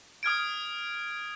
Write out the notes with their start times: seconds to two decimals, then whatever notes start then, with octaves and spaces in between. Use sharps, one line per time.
0.23 D#6 F6 G#6 D7